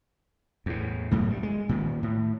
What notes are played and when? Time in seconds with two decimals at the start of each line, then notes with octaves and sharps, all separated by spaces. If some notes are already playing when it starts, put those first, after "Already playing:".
0.66 E2 A2
1.11 B1 F#2 A2 A3
1.30 G2
1.43 G#3
1.69 A#2 D#3
2.03 A2